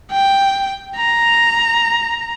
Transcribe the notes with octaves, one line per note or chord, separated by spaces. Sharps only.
G5
A#5